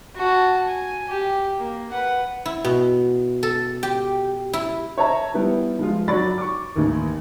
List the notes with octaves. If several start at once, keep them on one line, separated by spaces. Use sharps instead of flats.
F#4 A5
G#5
G4
A#3
B4 F#5
E4
B2
A4
G4
E4
C#5 E5 A5 A#5
G3 B3 E4
F3 G#3 F4
F#3 D5 B5 C#6 A6
C#6 D6
A1 D#2 D#3